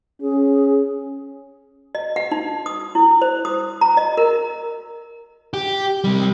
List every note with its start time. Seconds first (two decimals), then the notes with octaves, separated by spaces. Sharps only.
0.21 C#4 G#4
1.95 D#5
2.16 F#5
2.32 D#4
2.66 D#6
2.95 E4
3.22 C5
3.45 D#6
3.81 A#5
3.97 D#5
4.17 A#4
5.54 G4
6.04 C3 G3